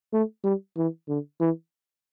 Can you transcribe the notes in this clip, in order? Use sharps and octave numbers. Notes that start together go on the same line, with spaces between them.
A3
G3
E3
D3
E3